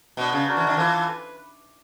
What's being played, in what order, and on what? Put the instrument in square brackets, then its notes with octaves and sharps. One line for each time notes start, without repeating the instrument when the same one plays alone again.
[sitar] B2 [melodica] B3 D4 F#4
[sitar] C#3
[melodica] D4 F#4 A#4
[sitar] E3
D#3
[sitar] E3 [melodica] F4 A4 C5
[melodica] B4